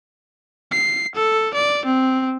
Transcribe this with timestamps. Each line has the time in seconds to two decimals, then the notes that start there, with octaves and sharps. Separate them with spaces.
0.72 C7
1.16 A4
1.54 D5
1.86 C4